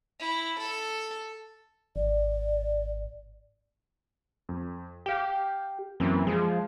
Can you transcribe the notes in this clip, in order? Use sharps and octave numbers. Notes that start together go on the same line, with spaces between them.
E4
A4
G#1 D5
F2
G4 F5 G5
F#2 E3 A#3 C4
F3 G#3 G#4